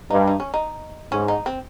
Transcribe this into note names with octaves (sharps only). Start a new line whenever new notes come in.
G2 D#4
D#4
C#4
D#4
G#2 C#4
D#4
C4